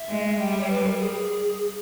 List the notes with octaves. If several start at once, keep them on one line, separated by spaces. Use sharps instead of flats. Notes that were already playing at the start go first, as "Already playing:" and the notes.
Already playing: E5
G#3
G3 G5
E5
C#5
B4
A#4
G#4